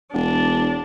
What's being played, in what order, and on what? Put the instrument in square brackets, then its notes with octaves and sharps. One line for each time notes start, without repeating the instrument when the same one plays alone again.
[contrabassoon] E1 [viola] D4